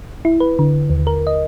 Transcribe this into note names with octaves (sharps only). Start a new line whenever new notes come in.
E4
B4
D3
D#2
A#4
D#5